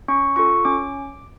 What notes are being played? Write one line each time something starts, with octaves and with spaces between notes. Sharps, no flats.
C#4 C#6
F4 A4 C#6
C#4 D6